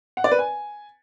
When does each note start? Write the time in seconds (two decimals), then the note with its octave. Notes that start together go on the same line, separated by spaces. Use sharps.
0.17 F#5
0.24 D5
0.32 B4
0.39 G#5